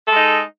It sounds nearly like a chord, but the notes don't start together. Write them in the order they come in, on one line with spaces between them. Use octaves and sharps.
A4 G#3 D#4